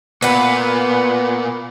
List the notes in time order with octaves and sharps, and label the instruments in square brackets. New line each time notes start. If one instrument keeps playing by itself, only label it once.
[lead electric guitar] A#2 [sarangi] B3 [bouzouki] B4 F#5